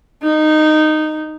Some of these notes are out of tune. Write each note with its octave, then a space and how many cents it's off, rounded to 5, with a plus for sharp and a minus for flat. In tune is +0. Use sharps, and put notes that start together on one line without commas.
D#4 -10